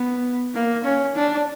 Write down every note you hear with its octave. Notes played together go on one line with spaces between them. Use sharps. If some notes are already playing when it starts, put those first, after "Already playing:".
Already playing: B3
A#3
C#4
D4